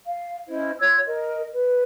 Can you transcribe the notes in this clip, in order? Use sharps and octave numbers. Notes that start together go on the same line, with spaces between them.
F5
C#4 E4 C5 D#5
F4 C#5 E6 G#6
A#4 D#5
B4